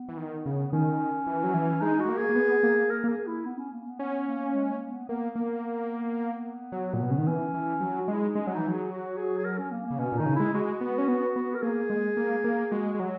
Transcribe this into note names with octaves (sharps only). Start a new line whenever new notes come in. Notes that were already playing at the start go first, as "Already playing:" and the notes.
Already playing: B3
E3
D#3
C#3
D#3 C#4
E3
F#3
E3
G#3 D#4
F#4
G#3
A#3
G#4
A#3
B3
A#3
A#4
A#3
G#4
E4
B3
C#4
A#3
B3
B3 C#4
A#3
G#3
A#3
B3
A#3 B3
A#3
F#3
A#2
B2
C#3
D#3
E3 C#4
E3
F#3
F#4
G#3 E4
D#4
G#3 C#4
F#3
E3 D#4
F#3 G#4
F#4
G#4
G#4
A#4
C#4
A#3
C#3 A#3
B2 C#4
A#2
D#3 D#4
C#3
G#3 E4
G#3 F#4
B3
C#4
B3
B3
A#4
A#3 G#4
G#3
A#3
A#3
G#3 F#4
G#3
F#3